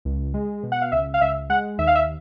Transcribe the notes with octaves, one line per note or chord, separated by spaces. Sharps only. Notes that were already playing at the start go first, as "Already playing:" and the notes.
C#2
G#3
B2
F#5
F5
C#2 E5
F5
C#2 E5
G#3 F#5
D#2 E5
F5
E5